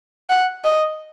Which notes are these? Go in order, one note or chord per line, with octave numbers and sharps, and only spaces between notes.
F#5
D#5